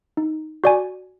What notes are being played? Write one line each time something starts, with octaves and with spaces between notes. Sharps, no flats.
D#4
F#4 D5 G#5